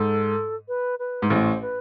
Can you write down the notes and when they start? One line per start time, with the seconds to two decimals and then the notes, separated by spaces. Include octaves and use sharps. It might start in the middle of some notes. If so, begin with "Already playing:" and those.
Already playing: G#2 A4
0.68 B4
0.99 B4
1.22 G#2
1.30 A1 A2 C5
1.62 B4